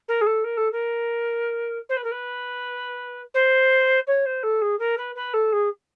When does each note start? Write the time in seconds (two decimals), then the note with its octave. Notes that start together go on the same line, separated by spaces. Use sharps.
0.08 A#4
0.21 G#4
0.26 A4
0.44 A#4
0.57 A4
0.72 A#4
1.89 C5
1.97 B4
2.04 A#4
2.12 B4
3.34 C5
4.07 C#5
4.26 C5
4.43 A4
4.62 G#4
4.79 A#4
4.97 B4
5.15 B4
5.34 A4
5.52 G#4